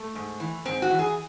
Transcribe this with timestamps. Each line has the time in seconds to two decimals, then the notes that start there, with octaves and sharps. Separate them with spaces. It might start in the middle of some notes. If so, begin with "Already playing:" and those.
Already playing: A3
0.15 G#2
0.40 E3
0.65 G#2 C4
0.82 F#4
0.91 E3
0.99 G#4